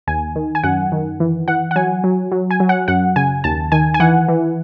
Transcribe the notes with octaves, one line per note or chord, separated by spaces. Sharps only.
D#2 G#5
D#3
G#5
F#2 F#5
D#3
E3
E3 F#5
F#5
F#3 G#5
F#3
F#3
G#5
F#3
F#5
F#2 F#5
C#3 G#5
D#2 A5
D#3 G#5
G#5
E3 F#5
E3